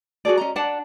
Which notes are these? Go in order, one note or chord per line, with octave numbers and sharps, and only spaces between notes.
F#4 G#4 A4 D5
C#4 D#5 A#5
D4 D5 F#5 A5